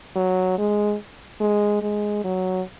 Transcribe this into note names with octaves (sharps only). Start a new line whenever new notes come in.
F#3
G#3
G#3
G#3
F#3